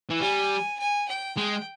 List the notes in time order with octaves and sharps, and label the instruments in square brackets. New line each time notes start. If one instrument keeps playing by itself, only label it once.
[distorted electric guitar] E3
[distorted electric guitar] G3 [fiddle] G#5
[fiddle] G#5
G5
[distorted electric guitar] G#3 [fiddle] G5